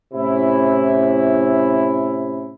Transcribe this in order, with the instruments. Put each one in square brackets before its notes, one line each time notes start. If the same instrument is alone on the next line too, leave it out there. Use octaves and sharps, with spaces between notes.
[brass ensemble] A2 C3 C#4 E4